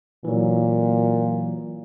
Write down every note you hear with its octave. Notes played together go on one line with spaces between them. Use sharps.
A#2 E3 F#3